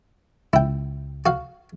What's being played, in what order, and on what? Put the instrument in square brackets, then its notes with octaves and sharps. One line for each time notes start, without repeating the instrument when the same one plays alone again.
[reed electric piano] C#2 [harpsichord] E4 G5
[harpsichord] F#4 F5